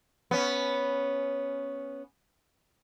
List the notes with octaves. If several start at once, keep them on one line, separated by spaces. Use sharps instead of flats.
B3 C#4